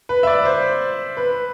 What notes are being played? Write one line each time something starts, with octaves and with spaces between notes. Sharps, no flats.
B4
E5
D5
C5
B4